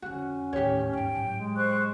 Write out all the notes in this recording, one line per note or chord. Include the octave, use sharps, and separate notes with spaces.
F2 D3 C#4 F#4
D#2 A2 G4 C#5
G#2 B3 G5
A2 F#3
G#3
C5 C#6 F#6